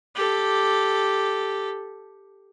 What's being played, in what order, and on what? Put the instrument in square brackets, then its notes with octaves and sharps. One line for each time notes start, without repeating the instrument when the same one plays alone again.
[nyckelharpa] G4 A4